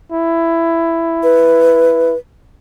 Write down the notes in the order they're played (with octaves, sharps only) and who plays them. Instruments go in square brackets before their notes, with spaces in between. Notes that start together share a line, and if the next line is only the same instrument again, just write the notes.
[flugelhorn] E4
[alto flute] B4